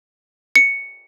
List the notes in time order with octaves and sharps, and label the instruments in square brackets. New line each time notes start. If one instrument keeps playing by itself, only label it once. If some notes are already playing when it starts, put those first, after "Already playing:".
[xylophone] C#7